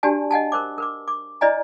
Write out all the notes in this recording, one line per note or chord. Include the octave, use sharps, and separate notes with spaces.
D4 F#4 G4 D5 G#5 A5
D#5 F#5 G#5 A5
A#4 C5 D6
A#4 B4 D6
D6
E4 B4 D5 D#5 G#5 A#5